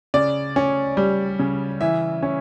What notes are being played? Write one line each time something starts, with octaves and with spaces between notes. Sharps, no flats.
C#3 D5
C#4
G3
C#3
E3 E5
C#4